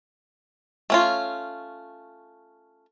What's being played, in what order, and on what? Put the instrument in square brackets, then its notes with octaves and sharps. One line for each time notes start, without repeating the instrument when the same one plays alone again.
[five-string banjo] A3 C#4 F4